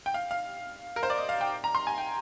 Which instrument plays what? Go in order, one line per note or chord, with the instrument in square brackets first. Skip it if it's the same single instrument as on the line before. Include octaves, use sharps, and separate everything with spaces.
[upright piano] G5
F5
F5
A#4
C5
D5
D#5
F5
G5
A#5
C6
G#5
G5